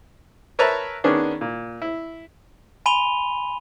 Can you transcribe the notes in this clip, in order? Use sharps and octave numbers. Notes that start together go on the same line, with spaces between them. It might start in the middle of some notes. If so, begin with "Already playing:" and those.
A#4 B4 C#5 E5 A5 A#5
D#3 B3 C#4 D4 G#4
A#2
E4
G#5 B5 C6 D#7 F7 G7